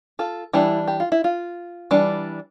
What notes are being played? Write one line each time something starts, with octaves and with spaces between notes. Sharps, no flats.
F4 A4
E3 G3 D4 E4 G4
G4
F4
E4
F4
E3 G3 D4